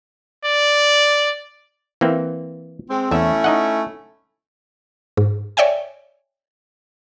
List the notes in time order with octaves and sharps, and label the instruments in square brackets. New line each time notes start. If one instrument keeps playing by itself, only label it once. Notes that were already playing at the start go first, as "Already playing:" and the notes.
[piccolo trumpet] D5
[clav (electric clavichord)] E3 A#3 C4
[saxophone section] G#3 C4
[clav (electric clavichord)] E2 E5 [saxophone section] A3 C#4 E4
[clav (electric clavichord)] D#4 D#5 F#5
[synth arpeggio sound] G#2
C#5 D5 E5 G5 G#5